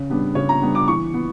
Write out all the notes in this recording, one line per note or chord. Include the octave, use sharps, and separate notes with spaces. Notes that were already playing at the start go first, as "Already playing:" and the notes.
Already playing: C#3
G3 B3 D4
C#3 C#5
A#5
G3 B3 D4
D6
E3 C#6
B3